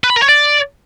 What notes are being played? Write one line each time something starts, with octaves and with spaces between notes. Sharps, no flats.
B4
B5
A#4
C#5
D5